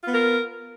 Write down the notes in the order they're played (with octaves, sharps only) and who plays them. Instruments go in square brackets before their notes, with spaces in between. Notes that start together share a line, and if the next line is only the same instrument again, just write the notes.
[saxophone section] F4
B3
A#4